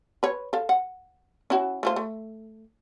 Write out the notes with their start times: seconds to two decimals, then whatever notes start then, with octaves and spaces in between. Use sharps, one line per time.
0.23 B4 C#5
0.53 A4 F5
0.69 F#5
1.50 C#4 E4 F#4
1.83 A3 F4 C5
1.96 A3